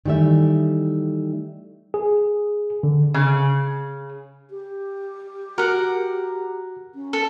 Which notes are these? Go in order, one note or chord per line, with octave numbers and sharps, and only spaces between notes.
D#3 E3 G3 A3 E5
G#4
D3
C#3
G4
F#4 A#4 F#5
C#4
A4